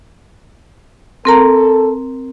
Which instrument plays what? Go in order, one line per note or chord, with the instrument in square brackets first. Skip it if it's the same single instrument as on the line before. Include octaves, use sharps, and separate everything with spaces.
[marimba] C4 A#4 A#5 [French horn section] A4